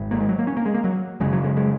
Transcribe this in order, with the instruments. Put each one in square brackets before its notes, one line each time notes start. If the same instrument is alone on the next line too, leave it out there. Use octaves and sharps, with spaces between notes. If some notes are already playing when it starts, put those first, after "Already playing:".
Already playing: [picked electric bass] G#1 G#2
A#3
G#3
F#3
A#3
C#4
A#3
G#3
A#3
F#3
F#1 F#2 C#3 G#3
F#3
G#3
G#3